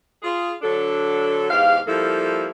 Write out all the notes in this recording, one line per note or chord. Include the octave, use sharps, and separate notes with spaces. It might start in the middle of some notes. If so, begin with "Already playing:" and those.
F4 G#4
D3 F#3 D4 A4
E2 G#2 G4 F5
F3 G3 A#3 E4 A4